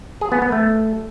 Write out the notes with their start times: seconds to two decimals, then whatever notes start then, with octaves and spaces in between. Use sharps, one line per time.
0.21 G#4
0.32 B3
0.42 B3
0.52 A3